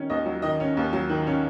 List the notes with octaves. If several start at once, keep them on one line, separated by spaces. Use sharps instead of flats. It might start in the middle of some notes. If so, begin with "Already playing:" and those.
Already playing: D#3 C#4
D#2 D#5
F#3
D#3 D#5
C#4
D#2
F#3
D#3
C#4